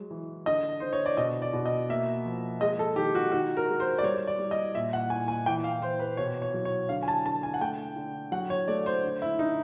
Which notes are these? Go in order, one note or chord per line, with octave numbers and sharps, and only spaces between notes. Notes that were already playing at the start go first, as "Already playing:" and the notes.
Already playing: F#3 G#3
E3
D3 D#5
D3 C5
C#5
D5
B2 D#5
D5
B2
D#5
A#3 E5
F3
G#3 D#5
A4
D#3 G4
F#4
D#3 F#4
A#4
G#3
C5
D5
G3 C#5
D5
G3
D#5
A#2 E5
F#5
A#2 G#5
G#5
E3 G5
F5
E3 C5
B4
B2 C#5
C#5
F#3
C#5
D3 F5
G#5
A5
D3 A5
G#5
F#5
A3 G5
D3
F#3 F#5
C#5
A3 D5
C5
D3
E4
D3 D#4